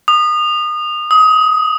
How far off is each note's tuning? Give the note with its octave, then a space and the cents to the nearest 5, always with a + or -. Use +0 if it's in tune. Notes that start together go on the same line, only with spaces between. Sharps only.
D#6 -30
D#6 +25